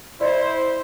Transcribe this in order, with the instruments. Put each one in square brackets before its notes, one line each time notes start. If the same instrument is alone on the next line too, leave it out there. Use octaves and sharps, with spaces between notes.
[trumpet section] E4 C5 [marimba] D5 D#5